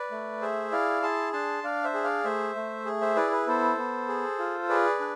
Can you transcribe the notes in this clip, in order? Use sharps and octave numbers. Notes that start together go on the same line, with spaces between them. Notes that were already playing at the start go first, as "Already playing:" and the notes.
Already playing: B4 D5
A3
G#4 C5 E5
E4 D5 F5
G#4 A5 C6
D4 A5 C6
D4 D5 F5
C5 E5
G#4
D5 F5
A3 C5 E5
A3
G#4
C5 E5
E4 B4 D5
B4
B3 A4 C5
B3
G#4
F4
G#4 B4 D5
D4